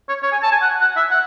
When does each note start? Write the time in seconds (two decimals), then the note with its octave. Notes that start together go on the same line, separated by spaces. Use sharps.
0.09 C#5
0.23 C#5
0.32 G#5
0.43 A5
0.52 G#5
0.62 F#5
0.81 F#5
0.97 E5
1.11 F#5